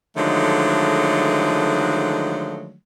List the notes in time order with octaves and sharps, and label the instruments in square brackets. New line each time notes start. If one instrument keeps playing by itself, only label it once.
[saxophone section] D3 D#3 F3 F#3 G#3 A3